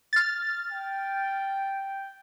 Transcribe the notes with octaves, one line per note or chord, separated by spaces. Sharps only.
F6 A6
G5